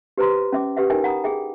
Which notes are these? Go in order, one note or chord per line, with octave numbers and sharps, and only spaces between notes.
G4 B4 C5 A#5 C6
C#4 E5 D6
G4 B4 E5 F#5
D#4 E4 A#4 E5 G5 G#5
F#5 A#5 B5 D#6
G#4 E5 G5